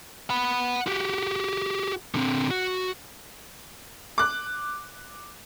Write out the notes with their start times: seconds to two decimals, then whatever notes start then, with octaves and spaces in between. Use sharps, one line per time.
0.30 F#5 B5
0.87 F#4 G4
2.15 D3 C4
2.51 F#4
4.18 D6 F#6